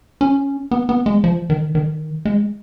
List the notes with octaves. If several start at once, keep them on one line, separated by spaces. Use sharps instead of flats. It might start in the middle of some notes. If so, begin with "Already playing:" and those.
C#4
B3
B3
G#3
F3
D#3
D#3
G#3